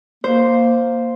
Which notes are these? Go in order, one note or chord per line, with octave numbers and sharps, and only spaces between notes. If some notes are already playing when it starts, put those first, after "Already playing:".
A#3 C5